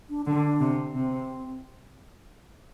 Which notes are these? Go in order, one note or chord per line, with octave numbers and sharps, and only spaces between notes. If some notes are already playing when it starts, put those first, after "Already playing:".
D4
D3 D4
C3
C3 C4